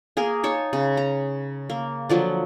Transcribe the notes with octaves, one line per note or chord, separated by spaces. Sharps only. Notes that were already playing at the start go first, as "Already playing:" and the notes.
A#3 G#4 A#4
D#4 C#5 A5
C#3
A#5
A#3
D3 F3 F#3